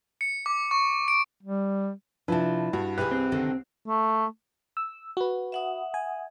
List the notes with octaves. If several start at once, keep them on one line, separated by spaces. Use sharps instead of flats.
C#7
D6
C#6
D7
G3
C3 F3 D4 E4 B4 A5
G2 F#4
C2 E4 G4 G#4 B4 F#6
C4
D3 D#3 A4
A3
E6
F#4 B4
E5 F#5 D#6
G#5